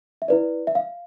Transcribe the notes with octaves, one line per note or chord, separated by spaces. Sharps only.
E5
E4 B4 D5
E5
F5